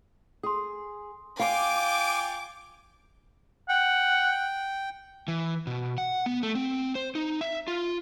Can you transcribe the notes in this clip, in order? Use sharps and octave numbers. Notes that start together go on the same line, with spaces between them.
G#4 C6 D#6
F4 F5 G5 G#5 D6
F#5 G5
E3
B2
F#5
B3
A3
C4
C5
D#4
E5
F4